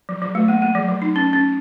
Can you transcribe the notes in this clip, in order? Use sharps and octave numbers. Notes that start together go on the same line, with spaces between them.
F#3
F#3
A3
A#3
A#3
F#3
F#3
D#4
C#4
C#4